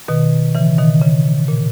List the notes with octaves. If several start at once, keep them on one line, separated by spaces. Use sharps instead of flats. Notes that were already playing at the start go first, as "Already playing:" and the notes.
B2 D#3
C#3 E3
B2 D#3
C#3
A#2